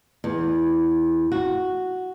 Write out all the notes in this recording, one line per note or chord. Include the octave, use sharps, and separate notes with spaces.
E2
F#4